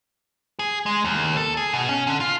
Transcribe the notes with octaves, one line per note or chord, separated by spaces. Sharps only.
G#4
G#3
D#2
A4
G#4
B2
C#4
D3
F4